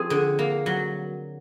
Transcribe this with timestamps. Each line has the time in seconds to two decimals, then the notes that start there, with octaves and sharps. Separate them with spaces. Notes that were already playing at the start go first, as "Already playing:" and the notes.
Already playing: F3 C4 G#4
0.10 D3
0.39 A#3
0.66 F#3